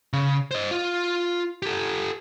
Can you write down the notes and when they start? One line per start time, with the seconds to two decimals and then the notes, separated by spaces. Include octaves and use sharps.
0.13 C#3
0.51 C5 D#5
0.71 F4
1.62 G4 A4